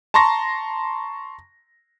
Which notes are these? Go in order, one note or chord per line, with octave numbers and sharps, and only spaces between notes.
A5 A#5 C6 C#6 A#6